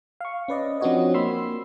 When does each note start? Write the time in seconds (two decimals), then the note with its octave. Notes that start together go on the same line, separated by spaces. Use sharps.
0.21 F5 C#6
0.48 C#4 B4 D5 D#5
0.81 F3 C4 D4 F#4 C#5 D#5
1.14 A#3 B5 C6 E6 C7